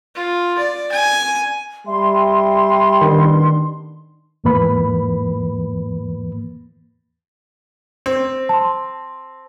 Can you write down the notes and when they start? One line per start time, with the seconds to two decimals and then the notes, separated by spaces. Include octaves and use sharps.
0.15 F4
0.58 D5
0.92 G#5
1.87 G3 E5 G5 C6
3.01 A1 D#3 B3 D4
4.44 E2 G#2 E3 A#3 B4 B5
8.06 C4
8.49 A5 C6